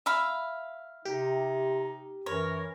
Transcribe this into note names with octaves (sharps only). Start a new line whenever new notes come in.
E5 F5 B5
C3 D#4 G4
F#2 E3 A#4 C#5